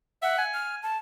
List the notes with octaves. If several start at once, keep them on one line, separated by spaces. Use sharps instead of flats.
E5 F#5
G#5
F6
A5